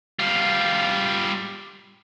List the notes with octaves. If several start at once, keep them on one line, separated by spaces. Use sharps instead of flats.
G3 F4